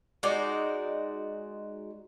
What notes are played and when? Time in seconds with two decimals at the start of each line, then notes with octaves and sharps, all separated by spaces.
0.23 G#3 D#4 F#4 D5